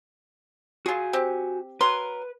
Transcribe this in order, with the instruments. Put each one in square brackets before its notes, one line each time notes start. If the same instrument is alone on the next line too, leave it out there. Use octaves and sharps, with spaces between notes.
[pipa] F4 G#4 [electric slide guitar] F#4 G#5
[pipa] C4 G4
[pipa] F#3 A#4 C6 [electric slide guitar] B4